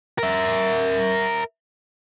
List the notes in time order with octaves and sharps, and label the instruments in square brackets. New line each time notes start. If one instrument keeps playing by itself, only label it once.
[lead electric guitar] A#4 E5